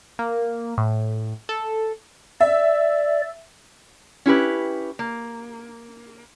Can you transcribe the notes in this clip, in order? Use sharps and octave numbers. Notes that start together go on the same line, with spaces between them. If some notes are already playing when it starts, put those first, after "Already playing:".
A#3
A2
A4
D5 E5
C#4 E4 G4 B4
A#3